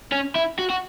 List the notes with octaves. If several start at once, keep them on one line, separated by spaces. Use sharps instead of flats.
C#4
E4
F#4
F#4